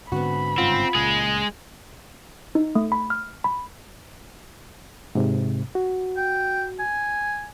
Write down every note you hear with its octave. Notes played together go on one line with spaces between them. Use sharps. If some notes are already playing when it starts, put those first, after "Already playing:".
G#2 D3 B3 C4 F#4 B5
G1 G#2 C#3 C4 F4 F#5
C#2 A#2 G#3 G#4
D#4
A3
B5
F6
B5
G#2 C3
F#4
G5
G#5